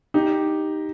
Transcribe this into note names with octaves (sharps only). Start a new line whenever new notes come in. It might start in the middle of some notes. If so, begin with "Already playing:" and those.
D#4 G4